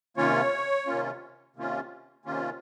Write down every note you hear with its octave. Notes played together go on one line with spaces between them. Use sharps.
C3 D#3 A#3 C#4 F4 C#5
C3 D#3 A#3 C#4 F4
C3 D#3 A#3 C#4 F4
C3 D#3 A#3 C#4 F4